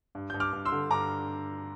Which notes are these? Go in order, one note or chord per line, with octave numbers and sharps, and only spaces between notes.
G2
G2 G6
D6 F6
G2
C6 E6
D3
G2 A#5 D6